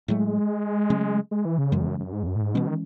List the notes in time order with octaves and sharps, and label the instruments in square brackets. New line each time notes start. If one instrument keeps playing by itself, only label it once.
[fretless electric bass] A2 F#3 A3 [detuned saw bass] G#3
[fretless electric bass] C#3 F#3 A3 C#4
[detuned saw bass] G#3
E3
C#3
[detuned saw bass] F#2 [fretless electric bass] C#3 E3 G#3
[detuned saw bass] E2
F#2
F#2
G#2
E2
F#2
A2
G#2
[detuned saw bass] B2 [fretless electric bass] E3 G#3 C#4
[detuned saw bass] D#3